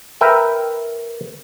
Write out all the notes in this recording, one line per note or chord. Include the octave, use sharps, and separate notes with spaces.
A#4 B4 E5 G5